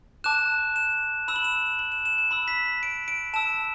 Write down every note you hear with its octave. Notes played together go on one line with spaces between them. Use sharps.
A5 D6 F#6 E7
E7
B5 E6 E7
F#7
E7
F#7
E7
E7
E7
B5 E6 F#7
B6
B6
D7
D7
A5 E6 E7